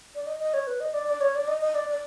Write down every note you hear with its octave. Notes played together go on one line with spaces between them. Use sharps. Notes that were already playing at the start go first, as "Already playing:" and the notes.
D5
D#5
D#5
C#5
B4
D#5
D5
D5
C#5
D5
D#5
D#5
D5
D5